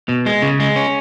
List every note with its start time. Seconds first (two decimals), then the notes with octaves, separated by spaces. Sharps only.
0.09 B2
0.26 G#3
0.42 C#3
0.60 G#3
0.76 C#4